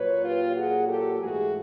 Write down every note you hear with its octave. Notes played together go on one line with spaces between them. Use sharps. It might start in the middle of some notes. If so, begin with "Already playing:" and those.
Already playing: A#2 F#3 A#3 B4 C#5
F4 G4
F#4 G#4
G4 A4
G#2 E3 A3 F#4 G#4